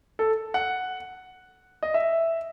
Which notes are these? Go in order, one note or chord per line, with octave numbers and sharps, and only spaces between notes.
A4
F#5
D#5
E5